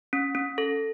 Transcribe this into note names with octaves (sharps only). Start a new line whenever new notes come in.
C#4
C#4
A4